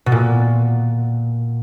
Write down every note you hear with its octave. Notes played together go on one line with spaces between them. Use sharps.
B2
A#2